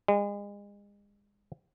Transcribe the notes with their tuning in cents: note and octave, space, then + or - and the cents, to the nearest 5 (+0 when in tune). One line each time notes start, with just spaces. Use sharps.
G#3 -35